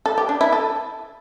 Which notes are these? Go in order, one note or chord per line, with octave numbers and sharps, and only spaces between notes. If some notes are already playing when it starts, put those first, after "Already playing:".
A4
G4
D4
E4
A4